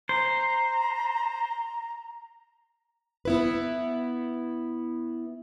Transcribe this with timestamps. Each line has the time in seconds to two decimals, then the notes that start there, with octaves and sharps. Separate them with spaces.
0.09 C5 A#5
3.25 B3 E4 B4